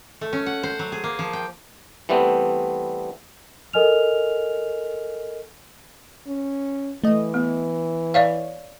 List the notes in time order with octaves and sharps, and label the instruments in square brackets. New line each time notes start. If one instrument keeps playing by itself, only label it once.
[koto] A3
C#4
F#5
C5
F#3
G#4
A#3
F3
G5
[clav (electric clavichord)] E3 G3 A3 B3 C4
[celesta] A4 A#4 D#5 G#5 F6 F7
[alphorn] C#4
[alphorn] E3 [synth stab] A3 D#5
[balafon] B3
[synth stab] C#5 [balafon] D5 E5 F5